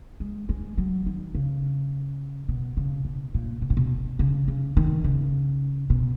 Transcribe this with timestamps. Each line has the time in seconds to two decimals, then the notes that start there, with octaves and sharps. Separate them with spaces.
0.20 G#3
0.49 G#3
0.78 F#3
1.06 D#3
1.35 C#3
2.48 B2
2.77 C#3
3.05 B2
3.34 A#2
3.62 B2
3.70 A#2
3.77 B2
4.19 C#3
4.48 C#3
4.77 D#3
5.04 C#3
5.90 B2